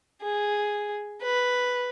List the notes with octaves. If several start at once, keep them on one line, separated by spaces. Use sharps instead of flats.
G#4
B4